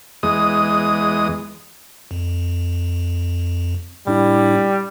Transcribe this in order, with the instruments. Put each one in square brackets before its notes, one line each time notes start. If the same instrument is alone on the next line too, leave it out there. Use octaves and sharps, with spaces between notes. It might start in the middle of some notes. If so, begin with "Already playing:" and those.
[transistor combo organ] E2 G#3 D#6
[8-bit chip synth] F2
[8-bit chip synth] A2 D4 E4 [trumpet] G3